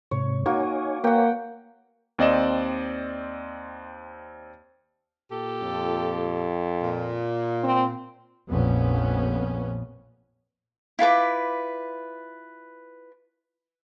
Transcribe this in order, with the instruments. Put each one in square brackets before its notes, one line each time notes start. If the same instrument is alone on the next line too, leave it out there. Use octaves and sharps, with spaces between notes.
[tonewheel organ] G#2 C3 [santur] C#5
[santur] A#3 F#4 [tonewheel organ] D#4 C#5 G#5
[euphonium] A#3 [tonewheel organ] B4 C#5 [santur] F#5 G5
[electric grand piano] D#2 C4 D5 D#5 E7
[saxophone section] A#2 G4 A4
[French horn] F2
[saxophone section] A#2
[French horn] C4
[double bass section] A#1 F2 B3 C#4
[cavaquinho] E4 F4 B4 D6